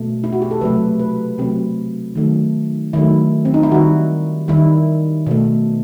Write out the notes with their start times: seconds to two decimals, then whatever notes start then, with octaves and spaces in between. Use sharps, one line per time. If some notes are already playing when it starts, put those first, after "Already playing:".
Already playing: B2 A3
0.24 E4
0.32 F#4
0.42 G4
0.51 A4
0.61 C3 F#3 A3 B4
0.99 B4
1.38 C3 F#3 A3 C4
2.15 D#3 F#3 A3
2.93 D#3 F#3 A3 E4
3.45 C4
3.54 D#4
3.63 E4
3.71 D#3 G3 F#4
4.48 D#3 G3 E4
5.27 B2 A3